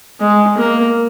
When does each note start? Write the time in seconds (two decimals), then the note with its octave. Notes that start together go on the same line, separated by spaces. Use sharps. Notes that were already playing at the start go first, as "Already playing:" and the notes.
0.20 G#3
0.57 A#3